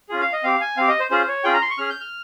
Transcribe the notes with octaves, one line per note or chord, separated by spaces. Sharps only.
C#4 F4 G#4
F5
D#5
C4 G4 F5
G#5
C4 G4 F5
D#5
C5
C#4 F4 G#4 C5
C#5
C#4 F4 G#4 G5
A#5
C6
C#6
C#4 G#4 F6
G6
F6